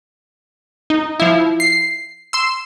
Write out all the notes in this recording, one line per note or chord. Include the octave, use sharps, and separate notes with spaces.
D#4
F3 E4
C7
C6 E6